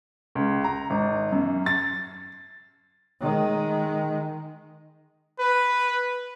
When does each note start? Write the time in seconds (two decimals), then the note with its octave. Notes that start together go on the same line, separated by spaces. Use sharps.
0.35 C#2
0.64 A#5
0.90 G#1
1.32 F#2
1.66 A6
3.21 D#3 G#3
5.39 B4